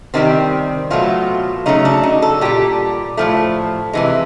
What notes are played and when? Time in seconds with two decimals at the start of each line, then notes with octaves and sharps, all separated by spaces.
0.14 C3 D#3 G3 C4
0.90 B2 F#3 A3 F4
1.66 C#3 F#3 A3 D#4
1.85 D4
2.03 D#4
2.22 A4
2.41 A#2 G3 G4
3.17 A2 F3 A3
3.93 C3 E3 G#3